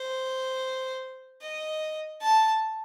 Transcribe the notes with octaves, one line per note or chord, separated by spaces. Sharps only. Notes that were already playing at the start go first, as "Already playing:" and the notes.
Already playing: C5
D#5
A5